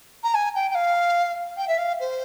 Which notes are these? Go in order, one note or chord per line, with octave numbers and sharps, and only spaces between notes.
A#5
G#5
G5
G5
F5
G5
E5
F5
C5